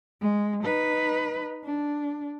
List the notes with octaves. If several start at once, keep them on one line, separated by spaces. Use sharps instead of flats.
G#3
D#4 B4
D4